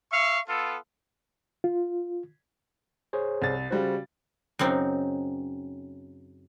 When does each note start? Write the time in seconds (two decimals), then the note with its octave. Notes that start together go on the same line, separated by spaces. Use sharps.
0.12 E5 F5 C#6
0.48 B3 F4 A4
1.64 F4
3.13 G#4 C5 C#5
3.42 C2 A6
3.71 C#3 G3 F#4 C5
4.59 F#2 C#3 C4 D#4